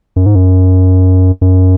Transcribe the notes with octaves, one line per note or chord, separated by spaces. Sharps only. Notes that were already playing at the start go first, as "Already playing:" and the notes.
F#2
G#2
F#2
F#2